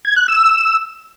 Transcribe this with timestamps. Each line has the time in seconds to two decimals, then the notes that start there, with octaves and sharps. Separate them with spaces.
0.05 G#6
0.16 F#6
0.28 E6